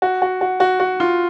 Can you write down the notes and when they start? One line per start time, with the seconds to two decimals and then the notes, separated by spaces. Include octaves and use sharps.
0.02 F#4
0.22 F#4
0.41 F#4
0.60 F#4
0.80 F#4
1.00 F4